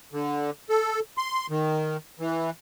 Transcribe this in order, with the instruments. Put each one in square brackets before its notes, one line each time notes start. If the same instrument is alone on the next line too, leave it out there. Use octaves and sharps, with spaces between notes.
[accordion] D3
A4
C6
D#3
E3